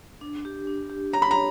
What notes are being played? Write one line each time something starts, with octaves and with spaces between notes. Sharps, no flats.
D4
G4
D4
G4
C#5 A#5
B5
A#5
C#5